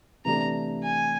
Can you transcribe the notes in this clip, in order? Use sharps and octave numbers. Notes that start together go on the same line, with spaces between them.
C3 E3 A3 D4 G4 A#5
G#5